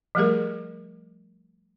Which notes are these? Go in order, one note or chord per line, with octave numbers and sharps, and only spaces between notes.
F3 G3 A3 G4 G#4 A#4